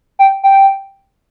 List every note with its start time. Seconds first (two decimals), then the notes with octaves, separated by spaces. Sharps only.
0.19 G5
0.43 G5